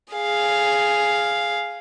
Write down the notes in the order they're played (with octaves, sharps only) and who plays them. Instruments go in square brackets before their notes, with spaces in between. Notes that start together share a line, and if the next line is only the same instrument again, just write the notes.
[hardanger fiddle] G#4 F5